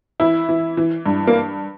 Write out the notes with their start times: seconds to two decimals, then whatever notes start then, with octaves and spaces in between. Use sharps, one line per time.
0.20 E3 E4
0.49 E3
0.77 E3
1.06 G2
1.27 A#3